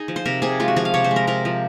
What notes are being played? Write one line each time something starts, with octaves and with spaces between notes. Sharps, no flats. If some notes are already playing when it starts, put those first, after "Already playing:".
Already playing: D#4 G#4
F3
C5
C3 A#4
C3 G#4
G#3 F4
F#4
F3 G#4
F5
C3 C#5
C5
G#3
A#4
C3 A#4
F3